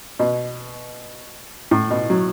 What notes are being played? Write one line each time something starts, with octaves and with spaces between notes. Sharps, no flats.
B2
A2
B2
F#3